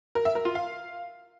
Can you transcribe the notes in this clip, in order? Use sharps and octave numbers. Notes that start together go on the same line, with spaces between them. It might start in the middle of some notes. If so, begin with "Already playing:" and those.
A#4
E5
A#4
F4
F5